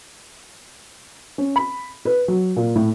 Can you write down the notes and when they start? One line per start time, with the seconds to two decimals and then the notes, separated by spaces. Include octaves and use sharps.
1.38 C#4
1.56 B5
2.05 B4
2.28 F#3
2.56 A#2
2.76 A2